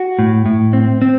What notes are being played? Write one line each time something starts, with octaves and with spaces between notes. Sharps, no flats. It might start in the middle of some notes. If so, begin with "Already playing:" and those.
Already playing: F#4
A2
A2
C4
C4